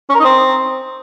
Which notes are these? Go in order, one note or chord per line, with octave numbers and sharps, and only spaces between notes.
C#4
A#4
D#4
C4